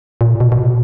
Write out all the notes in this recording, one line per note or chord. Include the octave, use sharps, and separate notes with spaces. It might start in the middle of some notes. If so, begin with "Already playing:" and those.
A#2
B2
B2
A#2